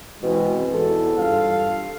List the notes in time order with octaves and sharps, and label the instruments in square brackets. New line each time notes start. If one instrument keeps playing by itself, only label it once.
[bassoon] B2 [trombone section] E3 G#3 C4
[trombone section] E2 G#2 [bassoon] A4
[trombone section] G2 F4 [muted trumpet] F5